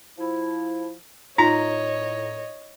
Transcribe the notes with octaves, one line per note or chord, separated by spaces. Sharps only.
F3 E4
A2 D#4 F4 C#5 D#5 A#5